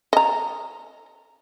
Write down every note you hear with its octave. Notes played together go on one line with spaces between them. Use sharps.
D#5 A#5